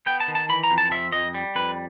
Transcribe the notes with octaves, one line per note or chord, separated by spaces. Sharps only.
B3 G5
A5
D#3
A5
E3 B5
A#5
F2
A5
F3 E5
F2 D#5
G3
F2 B4